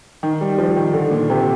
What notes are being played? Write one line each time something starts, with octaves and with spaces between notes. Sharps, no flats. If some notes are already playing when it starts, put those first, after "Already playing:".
D#3
G3
F3
D#3
D3
A#2
C3